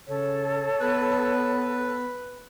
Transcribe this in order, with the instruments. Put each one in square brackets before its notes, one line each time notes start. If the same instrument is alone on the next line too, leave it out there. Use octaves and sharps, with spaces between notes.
[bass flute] C#3 [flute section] A4 [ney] C#5
[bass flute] B3 [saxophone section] B4